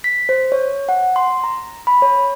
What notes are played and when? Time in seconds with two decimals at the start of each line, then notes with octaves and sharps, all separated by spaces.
0.04 B6
0.29 C5
0.52 C#5
0.89 F#5
1.16 C6
1.44 A#5
1.87 B5
2.02 C#5